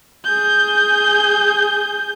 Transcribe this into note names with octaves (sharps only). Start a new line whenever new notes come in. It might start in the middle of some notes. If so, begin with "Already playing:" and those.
G#4 G6